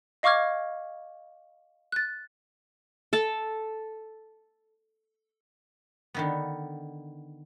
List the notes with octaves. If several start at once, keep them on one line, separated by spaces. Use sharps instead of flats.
D#5 F5 C#6 D6 F6 G#6
F#6 A6
A4 A5
D3 D#3 B3